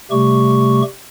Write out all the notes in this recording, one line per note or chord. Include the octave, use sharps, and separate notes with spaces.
C3 G3 A3 G4 C#6